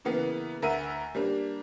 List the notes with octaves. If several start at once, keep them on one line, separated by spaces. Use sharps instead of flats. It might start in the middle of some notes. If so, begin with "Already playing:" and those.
C#3 E3 A#3 B3
D2 A#4 E5 F#5 D#7
G3 A#3 D4